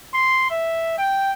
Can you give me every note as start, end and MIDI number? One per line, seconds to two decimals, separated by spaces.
0.14 0.48 84
0.50 0.96 76
0.98 1.31 79